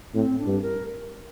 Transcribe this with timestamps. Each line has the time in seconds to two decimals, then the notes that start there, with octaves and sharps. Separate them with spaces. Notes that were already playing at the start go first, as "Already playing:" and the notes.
0.14 A2 C4
0.39 D4
0.47 G2
0.62 A#4